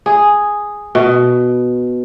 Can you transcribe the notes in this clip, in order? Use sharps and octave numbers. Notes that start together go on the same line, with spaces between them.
G#4
B2